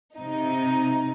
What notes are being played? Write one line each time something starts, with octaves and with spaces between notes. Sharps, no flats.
C3 D#4